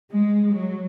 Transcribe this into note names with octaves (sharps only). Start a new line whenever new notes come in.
G#3
F#3